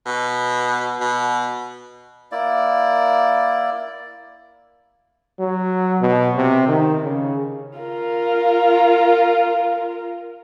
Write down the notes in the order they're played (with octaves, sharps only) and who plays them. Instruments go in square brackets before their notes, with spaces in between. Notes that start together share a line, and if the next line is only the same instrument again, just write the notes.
[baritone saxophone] B2
B2
[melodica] A#3 E4 D5
[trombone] F#3
B2
C3
D#3
C#3
[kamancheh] F4 A#4